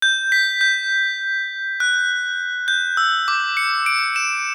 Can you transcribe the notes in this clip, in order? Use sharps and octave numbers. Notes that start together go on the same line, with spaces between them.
G6
B6
G6
F#6
G6
E6
D6
C#7
D7
E7